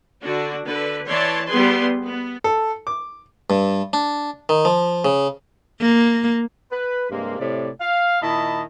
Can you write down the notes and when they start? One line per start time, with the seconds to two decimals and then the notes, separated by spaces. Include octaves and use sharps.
0.23 D3 D4 F#4
0.65 D3 B4
1.08 E3 C#5 D5 A5 C6
1.47 G3 B3 G#4 B4 C6
2.05 B3
2.44 A4
2.87 D6
3.50 G2
3.93 D4
4.49 D#3
4.65 F3
5.05 C#3
5.81 A#3
6.72 B4
7.10 G2 C3 G#3 A#3
7.39 A2 C3 D5
7.80 F5
8.21 A#2 D#3 E4 D#5 A5 B5